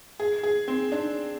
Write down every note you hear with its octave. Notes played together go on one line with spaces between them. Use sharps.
G#4
G#4
C4
D4